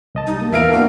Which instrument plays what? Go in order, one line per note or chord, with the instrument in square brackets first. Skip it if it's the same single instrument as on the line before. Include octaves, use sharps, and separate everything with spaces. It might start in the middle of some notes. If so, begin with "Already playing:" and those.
[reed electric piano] C2 D#5 A5
[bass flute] G3 [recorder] D#4
[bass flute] A#3 [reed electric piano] A5 D#6
[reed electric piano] E2 [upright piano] E4 F5 D7 [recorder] A#4 [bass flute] B4
[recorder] A#3 [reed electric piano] B3 D4 F#4 [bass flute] A#4